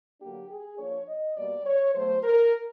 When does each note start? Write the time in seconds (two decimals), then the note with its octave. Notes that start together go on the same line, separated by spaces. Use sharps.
0.20 D3 F#3 A#3 D4 G4
0.49 G#4
0.78 F3 A#3 D4 C#5
1.07 D#5
1.36 B2 G3 A#3 D5
1.66 C#5
1.94 B2 F#3 A3 C5
2.23 A#4